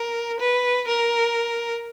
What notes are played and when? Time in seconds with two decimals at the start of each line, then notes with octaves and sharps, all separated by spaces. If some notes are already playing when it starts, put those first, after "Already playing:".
Already playing: A#4
0.41 B4
0.88 A#4